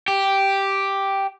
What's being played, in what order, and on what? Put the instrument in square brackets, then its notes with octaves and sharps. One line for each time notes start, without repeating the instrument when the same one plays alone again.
[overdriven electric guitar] G4